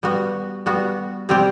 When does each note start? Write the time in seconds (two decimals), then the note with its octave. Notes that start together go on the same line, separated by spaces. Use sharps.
0.03 G3 B3 F#4
0.66 G3 B3 F#4
1.29 C3 G3 C4 G4